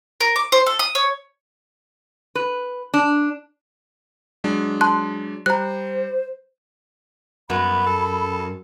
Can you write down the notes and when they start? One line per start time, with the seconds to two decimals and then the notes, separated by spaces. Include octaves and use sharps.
0.21 A#4
0.36 D6
0.52 C5
0.66 A4
0.79 D#6
0.95 C#5
2.35 B4
2.94 D4
4.44 F#3 G#3 D4
4.81 A5 C6 F#6
5.46 G3 C5 A#5 F#6
7.50 F#2 B3 B5
7.86 A4